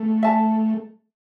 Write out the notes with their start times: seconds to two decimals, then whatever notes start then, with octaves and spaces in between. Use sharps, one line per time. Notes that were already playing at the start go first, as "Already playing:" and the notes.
Already playing: A3
0.23 E5 A5